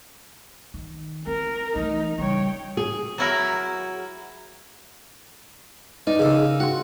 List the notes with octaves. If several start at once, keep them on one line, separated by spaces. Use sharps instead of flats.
D#3
C4 A#4
E3 A3 D#4
C#3 G3 C#5 G5
G#4
F#3 E4 A#4
D#4 B4 D5
C#3 G#4 A#4 D6 E6
F#4 F#5 G5 C6